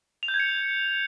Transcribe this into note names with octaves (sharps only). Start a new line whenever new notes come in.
F7
G6
G#6
C#7